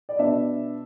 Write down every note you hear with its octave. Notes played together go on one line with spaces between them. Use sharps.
D5
B2 B3 D4 E5